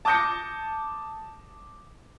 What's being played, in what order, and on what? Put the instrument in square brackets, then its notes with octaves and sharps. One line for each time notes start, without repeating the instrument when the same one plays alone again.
[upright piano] A5 D6 D#6 G6 A#6 C#7